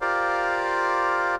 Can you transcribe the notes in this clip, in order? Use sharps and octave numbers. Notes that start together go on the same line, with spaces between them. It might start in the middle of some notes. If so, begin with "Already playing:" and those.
F4 G4 A#4 C5 D5 F5